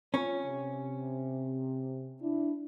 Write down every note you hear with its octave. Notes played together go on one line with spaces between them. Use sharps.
C#4 F4 C#5
C3
D4 E4